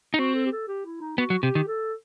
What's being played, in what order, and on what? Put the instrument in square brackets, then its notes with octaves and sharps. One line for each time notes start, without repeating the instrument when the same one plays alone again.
[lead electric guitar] D#4
[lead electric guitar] C4 [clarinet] F#4
[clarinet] A4
G4
A4
G4
E4
D#4
[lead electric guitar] B3 [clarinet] F#4
[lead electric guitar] F#3
[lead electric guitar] C3 [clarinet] G4
[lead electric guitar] D#3
[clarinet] A4